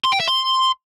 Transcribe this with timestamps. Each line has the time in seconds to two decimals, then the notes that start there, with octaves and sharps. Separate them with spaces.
0.05 C6
0.13 G5
0.20 E5
0.28 C6